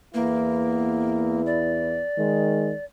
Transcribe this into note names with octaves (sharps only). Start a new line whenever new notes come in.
E2 A#3 B3 E4
D5
D#3 G#3